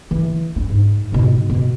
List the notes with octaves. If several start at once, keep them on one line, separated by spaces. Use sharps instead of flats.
E3
D4
G#2
G#2 B2
B2